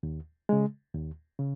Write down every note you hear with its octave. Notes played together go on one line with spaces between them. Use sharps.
D#2
C#3 G#3
D#2
C#3